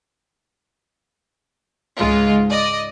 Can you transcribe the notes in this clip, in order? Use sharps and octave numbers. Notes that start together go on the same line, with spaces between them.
C#2 G#2 G#3 F4
D5 D#5